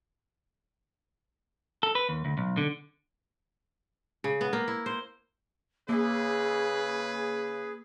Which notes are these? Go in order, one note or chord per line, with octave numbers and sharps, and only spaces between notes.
A4
B4
D#2
D2
B1
D3
C#3
B3
A#3
E4
C5
C#3 A#3 G#4 B4 D6 E6